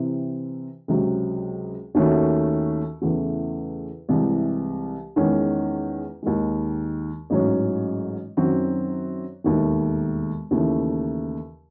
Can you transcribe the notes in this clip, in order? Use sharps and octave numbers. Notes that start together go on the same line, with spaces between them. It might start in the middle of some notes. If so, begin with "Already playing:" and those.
Already playing: C3 E3 C4
C#2 C3 F#3 C4
D#2 D#3 A3 C#4 F#4
E2 C#3 E3 A3
C2 C3 E3 G#3
E2 D#3 G#3 C#4
D#2 D#3 G#3
A1 G#2 F#3 C#4
F#2 D#3 F#3 C4 F#4
E1 D#2 D#3 A3
D#2 C#3 E3 A3